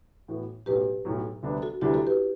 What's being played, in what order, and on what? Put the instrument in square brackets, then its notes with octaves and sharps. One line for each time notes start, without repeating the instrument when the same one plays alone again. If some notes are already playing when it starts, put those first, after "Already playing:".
[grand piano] A2 E3 B3 F#4
[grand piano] B1 A2 F#3 [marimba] G4 B4
[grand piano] B1 A2 F#3
D2 C3 G3 B3 D4
[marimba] F#4 A4
[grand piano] D2 C3 G3 B3 D4 [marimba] E4 G4
[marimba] F#4 A4
G4 B4